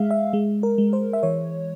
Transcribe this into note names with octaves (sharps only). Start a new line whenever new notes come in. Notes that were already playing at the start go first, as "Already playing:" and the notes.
Already playing: G#3 E5 F5
E5
G#3
A#4
G#3
C5
E5
E3 C#5